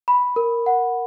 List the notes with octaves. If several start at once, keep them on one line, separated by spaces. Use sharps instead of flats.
B5
A#4
F#5